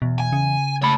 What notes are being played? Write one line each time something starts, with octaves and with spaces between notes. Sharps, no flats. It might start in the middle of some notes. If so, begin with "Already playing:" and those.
E2 B2
G#5
C#3
C#2 A3 C#5 A5 B5